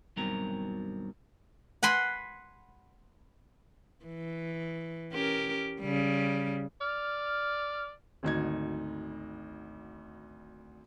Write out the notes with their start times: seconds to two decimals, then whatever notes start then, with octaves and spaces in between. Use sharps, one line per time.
0.16 G2 B2 D#3 F#3 C4 A#4
1.83 F#5 G#5 B5 C6
4.05 E3
5.12 C#4 G4 A#4
5.81 C#3 G3
6.81 D5 F6
8.23 G#1 D2 D#4 G#6